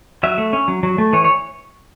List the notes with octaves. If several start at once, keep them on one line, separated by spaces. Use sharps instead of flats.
F#3 E5
A3
C#4
F#3
F#3
A3
E3 C#5
C#5